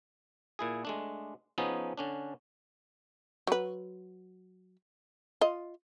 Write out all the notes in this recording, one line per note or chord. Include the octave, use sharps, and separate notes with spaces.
A#2 E4 G#4
G#3 A3 D4
F3 B3 C#4 D#4 G#4
D3 C#4 D4
F#3 B4
F4 D#5